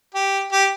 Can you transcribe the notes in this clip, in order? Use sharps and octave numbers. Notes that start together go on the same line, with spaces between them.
G4
G4